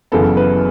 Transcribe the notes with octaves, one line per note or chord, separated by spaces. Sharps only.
F#1 F#2 C#3 E3 B3 A4
B4